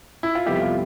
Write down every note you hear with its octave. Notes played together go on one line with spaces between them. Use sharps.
E4
F4
F2 C3 G3 B3 E4 G4
F4